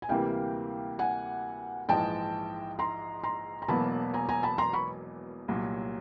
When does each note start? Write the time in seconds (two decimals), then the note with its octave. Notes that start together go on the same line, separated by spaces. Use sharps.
0.02 G#5
0.09 D2 C3 E3 G3 A#3 F5 G5
0.99 F#5 G#5
1.89 A#1 G#2 E3 G#3 G5 A5
2.79 A#5 C6
3.23 A#5 C6
3.62 A#5
3.68 E1 E2 B2 F#3 A#3 A5 B5
4.14 G#5 A#5
4.29 G#5 A#5
4.43 A5 B5
4.58 A#5 C6
4.73 B5 C#6
5.48 C2 A#2 F#3